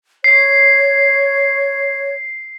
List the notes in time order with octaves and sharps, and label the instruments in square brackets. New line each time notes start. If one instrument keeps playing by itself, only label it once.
[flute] C#5 [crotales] C7